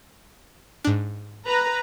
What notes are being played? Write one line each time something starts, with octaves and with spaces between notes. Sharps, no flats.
G#2 D4
B4 A#5